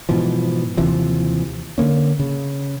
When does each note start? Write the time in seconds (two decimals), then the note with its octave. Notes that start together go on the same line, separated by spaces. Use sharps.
0.09 G#2 B2 E3 F3
0.77 D#2 C3 E3 F3
1.78 D3 F#3 A#3 C#4
2.19 C#3